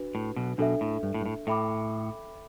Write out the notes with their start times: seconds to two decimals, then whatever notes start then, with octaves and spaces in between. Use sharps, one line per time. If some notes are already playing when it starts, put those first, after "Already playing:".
Already playing: D4 F#4 B4
0.15 A2
0.36 B1 B2
0.58 B1 B2 D4 A4 E5
0.81 A2
1.03 G2
1.14 A2
1.21 G2
1.26 A2
1.47 A2 A4 E5 G5 B5 D6